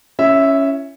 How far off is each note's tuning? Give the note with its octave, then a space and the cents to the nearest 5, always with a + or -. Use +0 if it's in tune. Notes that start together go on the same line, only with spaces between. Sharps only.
C#4 +0 E4 +35 E5 -5